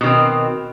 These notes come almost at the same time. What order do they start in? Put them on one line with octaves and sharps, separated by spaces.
B2 D#3 C4